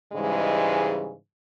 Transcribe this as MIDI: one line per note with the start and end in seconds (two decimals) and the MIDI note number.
0.13 1.14 44
0.13 1.14 49
0.13 1.14 52
0.13 1.14 55
0.13 1.14 56